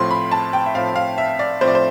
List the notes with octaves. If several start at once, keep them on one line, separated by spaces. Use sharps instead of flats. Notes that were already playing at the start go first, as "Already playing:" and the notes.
Already playing: A2 F3 C4 C6
B5
A5
G5
E5
A2 F3 C4 F5
F5
E5
D5
A2 F3 C4 C5
D5
C5